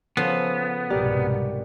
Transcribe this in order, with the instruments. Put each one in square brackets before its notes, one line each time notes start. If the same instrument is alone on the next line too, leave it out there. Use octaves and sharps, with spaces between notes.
[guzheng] C#3 F3 C6 [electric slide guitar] B3 [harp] A4
[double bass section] C2 G#2 B2 [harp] G4 A#4 D5